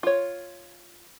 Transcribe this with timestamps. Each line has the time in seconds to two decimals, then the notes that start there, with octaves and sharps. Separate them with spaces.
0.03 F4 C#5